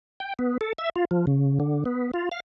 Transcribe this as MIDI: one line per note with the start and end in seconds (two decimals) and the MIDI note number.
0.20 0.34 79
0.39 0.58 59
0.61 0.73 69
0.78 0.90 76
0.96 1.05 65
1.11 1.26 53
1.27 1.59 49
1.60 1.84 50
1.85 2.11 59
2.14 2.29 65
2.32 2.40 77